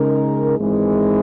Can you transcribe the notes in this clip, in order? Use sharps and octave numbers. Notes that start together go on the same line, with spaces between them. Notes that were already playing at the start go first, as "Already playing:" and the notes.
Already playing: C#3 G#3 D#4 A#4
G#1 G#2 E3 G#3